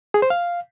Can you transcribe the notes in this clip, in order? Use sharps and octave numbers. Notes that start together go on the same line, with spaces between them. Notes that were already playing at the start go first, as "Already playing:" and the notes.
G#4
C5
F5